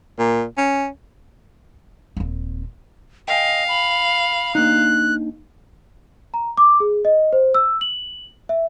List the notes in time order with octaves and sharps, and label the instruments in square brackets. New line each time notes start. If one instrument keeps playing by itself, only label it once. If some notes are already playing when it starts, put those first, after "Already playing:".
[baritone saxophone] A#2
C#4
[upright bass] D#1 C4
[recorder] D#5 [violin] F5 [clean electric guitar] G5 G#5
[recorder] B5
[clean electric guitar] A#3 D4 D#4 [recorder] F#6
[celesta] A#5
D6
G#4
D#5
C5
E6
F#7
E5